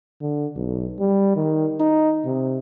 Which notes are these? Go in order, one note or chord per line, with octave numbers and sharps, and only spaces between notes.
D3
B1
G3
D#3
D#4
C3